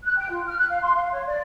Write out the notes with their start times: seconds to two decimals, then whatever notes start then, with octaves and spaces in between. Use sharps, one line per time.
0.03 F#6
0.16 G5
0.29 F4
0.46 F6
0.57 F#6
0.69 F5
0.81 C6
0.94 F5
1.12 C#5
1.26 D5